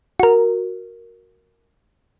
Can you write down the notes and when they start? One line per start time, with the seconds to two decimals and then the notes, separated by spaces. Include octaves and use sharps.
0.20 F#4 A#4